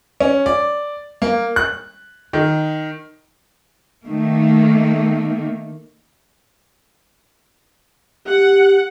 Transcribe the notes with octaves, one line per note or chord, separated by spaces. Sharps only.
C#4
D5
A#3
F#6
D#3
D#3 A3 A#3
G4 F#5